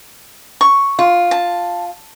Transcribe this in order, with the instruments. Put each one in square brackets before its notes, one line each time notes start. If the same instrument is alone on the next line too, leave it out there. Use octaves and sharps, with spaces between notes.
[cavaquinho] C#6
[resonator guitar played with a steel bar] F4
[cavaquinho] A5